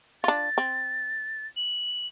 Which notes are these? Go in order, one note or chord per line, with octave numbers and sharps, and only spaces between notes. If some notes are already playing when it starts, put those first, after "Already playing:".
D4 F4 A6
C4
F#7